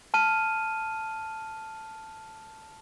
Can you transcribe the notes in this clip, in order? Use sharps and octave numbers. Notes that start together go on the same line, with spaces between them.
A5 F6 D#7